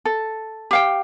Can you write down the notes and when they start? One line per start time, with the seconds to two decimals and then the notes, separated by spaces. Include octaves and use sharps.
0.05 A4
0.71 G4 F5 G5